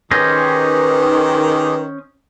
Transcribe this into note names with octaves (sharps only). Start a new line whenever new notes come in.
D#3 C#4 D#4 G4 G#4 B4 C5 D#5